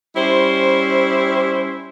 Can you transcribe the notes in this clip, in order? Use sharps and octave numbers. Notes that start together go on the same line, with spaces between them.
G3 C#4 E4 C5